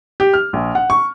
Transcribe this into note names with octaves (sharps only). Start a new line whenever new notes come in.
G4
F6
A#1
F#5
C#6